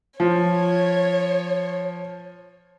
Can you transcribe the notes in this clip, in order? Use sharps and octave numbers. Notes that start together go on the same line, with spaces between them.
F3 C#5